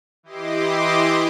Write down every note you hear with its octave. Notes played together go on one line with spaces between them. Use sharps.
E3 E4 G4 D#5 C6 D6